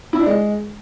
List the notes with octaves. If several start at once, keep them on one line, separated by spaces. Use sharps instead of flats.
E4
D4
G#3